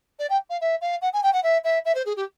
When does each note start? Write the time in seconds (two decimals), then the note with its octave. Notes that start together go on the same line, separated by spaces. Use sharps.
0.19 D5
0.30 G5
0.50 F5
0.61 E5
0.81 F5
1.02 F#5
1.13 G#5
1.23 G5
1.33 F#5
1.43 E5
1.64 E5
1.85 E5
1.95 C5
2.06 G#4
2.17 G4